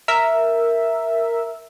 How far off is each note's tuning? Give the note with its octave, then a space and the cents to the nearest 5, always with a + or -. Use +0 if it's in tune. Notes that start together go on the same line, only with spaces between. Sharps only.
A#4 +0 E5 +0